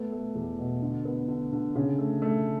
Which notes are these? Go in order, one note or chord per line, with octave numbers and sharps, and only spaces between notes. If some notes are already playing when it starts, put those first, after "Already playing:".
Already playing: A3 B3
A3
E2
B2
D3
B3
D3
D3
C#3
A3
A3